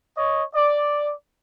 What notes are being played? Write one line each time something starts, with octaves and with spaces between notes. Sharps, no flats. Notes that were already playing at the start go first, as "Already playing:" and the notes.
C#5 D#5
D5